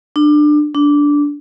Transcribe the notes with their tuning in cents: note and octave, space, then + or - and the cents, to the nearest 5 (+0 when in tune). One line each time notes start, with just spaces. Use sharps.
D4 +25
D4 -10